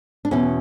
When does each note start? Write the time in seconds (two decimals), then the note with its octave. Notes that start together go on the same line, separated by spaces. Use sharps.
0.25 D4
0.31 E2 B2 C#4